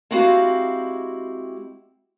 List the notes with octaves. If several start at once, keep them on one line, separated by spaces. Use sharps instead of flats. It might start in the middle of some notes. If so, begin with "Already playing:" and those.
G#3 C4 E4 F#4 G4 F5